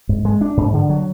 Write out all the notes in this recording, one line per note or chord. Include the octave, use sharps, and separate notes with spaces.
G#2
G#3
D4
G#2
D3
F#3